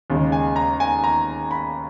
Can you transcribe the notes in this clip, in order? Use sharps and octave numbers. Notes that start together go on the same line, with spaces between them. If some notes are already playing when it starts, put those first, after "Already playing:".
D#2 C#3 G#3
G#5
A#5
G#5
A#5
B5